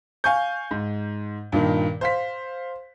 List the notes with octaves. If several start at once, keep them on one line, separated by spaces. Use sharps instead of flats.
F5 G#5 C#6 G6
G#2
G2 A#2 D#3
C5 F5 B6